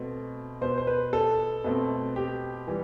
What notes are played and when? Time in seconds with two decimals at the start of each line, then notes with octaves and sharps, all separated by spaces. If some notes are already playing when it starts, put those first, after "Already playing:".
Already playing: B2 A3 C4
0.61 B2 B3 C5
0.78 C5
0.87 B4
1.13 A4
1.64 B2 A3 C4
2.16 G4
2.68 E3 G3